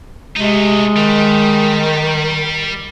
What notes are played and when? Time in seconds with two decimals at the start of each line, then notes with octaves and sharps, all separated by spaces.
0.37 C3 G#3 A3 D#4
0.96 D#3 G3